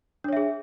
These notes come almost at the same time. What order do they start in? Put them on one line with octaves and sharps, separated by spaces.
D4 C#5 E5 G#4